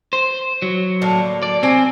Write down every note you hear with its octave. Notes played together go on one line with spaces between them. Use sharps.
C5
F#3
A2 D3 A#3
D5
C3 C4 C#4 G#5